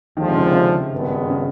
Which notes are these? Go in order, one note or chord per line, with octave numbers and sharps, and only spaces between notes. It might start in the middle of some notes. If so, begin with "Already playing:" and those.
D#2 D3 D#3 F3 G#3
C3
C#3
C#3
G#1 G2 D#3 G#3 B3
C#3